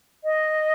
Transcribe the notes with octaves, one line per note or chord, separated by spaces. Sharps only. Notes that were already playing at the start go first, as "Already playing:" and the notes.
D#5